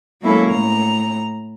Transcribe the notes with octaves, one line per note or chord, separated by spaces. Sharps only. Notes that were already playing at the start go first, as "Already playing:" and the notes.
F#3 G#3 A#3 C#4 E4 A4
A2 A#5